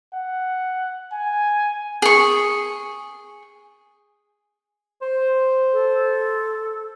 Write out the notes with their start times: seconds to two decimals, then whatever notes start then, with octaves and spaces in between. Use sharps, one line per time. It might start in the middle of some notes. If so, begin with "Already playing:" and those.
0.14 F#5
1.12 G#5
2.02 G#4 C#6
5.02 C5
5.73 A4